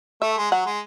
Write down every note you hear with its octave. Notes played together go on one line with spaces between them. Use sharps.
A3 E5
G#3
F#3 F#5
G#3